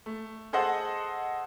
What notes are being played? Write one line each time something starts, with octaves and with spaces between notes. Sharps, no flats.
A3
G#4 A4 C5 D#5 F#5